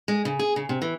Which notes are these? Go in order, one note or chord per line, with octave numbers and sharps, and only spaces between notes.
G#3
C#3
G#4
C#3
C3
E3